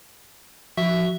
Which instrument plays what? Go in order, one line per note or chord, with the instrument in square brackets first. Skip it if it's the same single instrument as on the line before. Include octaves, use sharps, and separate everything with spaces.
[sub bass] F3 [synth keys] F#4 [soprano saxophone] E5